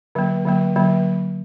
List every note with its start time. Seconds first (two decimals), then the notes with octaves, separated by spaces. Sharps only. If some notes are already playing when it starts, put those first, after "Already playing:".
0.15 D3 F#3 A#3
0.45 D3 F#3 A#3
0.76 D3 F#3 A#3